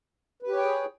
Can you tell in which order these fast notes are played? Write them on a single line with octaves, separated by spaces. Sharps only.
B4 G4 C#5 G5 G#4